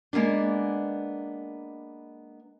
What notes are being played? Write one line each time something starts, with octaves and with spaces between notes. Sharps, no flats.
G#3 A#3 B3 D4